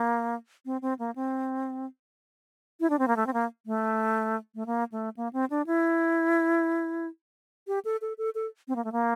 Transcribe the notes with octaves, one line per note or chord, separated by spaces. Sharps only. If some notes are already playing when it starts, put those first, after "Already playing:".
Already playing: A#3
C4
C4
A#3
C4
E4
D4
C4
A#3
A3
C4
A#3
A3
A3
A#3
A3
A#3
C4
D4
E4
G4
A4
A4
A4
A4
C4
A#3
A3
A#3